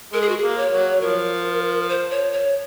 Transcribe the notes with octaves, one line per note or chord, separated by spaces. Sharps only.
G#3 A#4
G#4
F#4
G#4
A#3
C#5
F#3
F3 A#4
C5
C#5
C#5